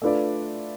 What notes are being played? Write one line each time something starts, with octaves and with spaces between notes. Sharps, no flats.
A3 D4 F4 B4 D5